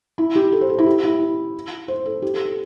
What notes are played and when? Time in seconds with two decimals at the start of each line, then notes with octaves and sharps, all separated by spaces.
0.18 E4
0.35 G4
0.52 A4
0.61 C5
0.69 A4
0.78 E4
0.86 G4
1.03 E4
1.88 C5
2.06 A4
2.22 G4
2.34 A4
2.45 A4